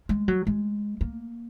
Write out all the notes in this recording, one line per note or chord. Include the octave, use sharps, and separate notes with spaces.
G#3
F#3
G#3
A#3